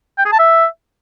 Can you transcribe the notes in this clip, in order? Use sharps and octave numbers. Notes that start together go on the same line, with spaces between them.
G5
G#4
A5
E5